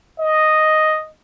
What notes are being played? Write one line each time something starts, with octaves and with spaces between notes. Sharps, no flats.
D#5